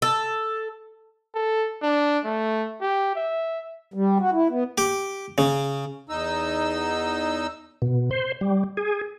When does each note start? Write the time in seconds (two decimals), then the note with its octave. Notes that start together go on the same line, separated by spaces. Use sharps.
0.02 A4
1.35 A4
1.83 D4
2.25 A3
2.81 G4
3.16 E5
3.94 G3
4.20 F#4
4.33 E4
4.50 B3
4.78 G4
5.38 C#3
6.09 E2 D#4 E6
7.82 B2
8.11 C5
8.41 G3
8.77 G#4